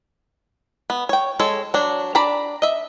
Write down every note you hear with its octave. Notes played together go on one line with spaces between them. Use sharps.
B3
C#5 G5
G#3 A4 C#5
F#3 D4
D4 D5 A#5 B5
D#5 E5